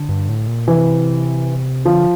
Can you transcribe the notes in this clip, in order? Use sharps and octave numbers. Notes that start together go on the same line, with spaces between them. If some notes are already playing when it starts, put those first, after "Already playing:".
Already playing: D3
G2
A2
A#2
C3 E3
D3 F3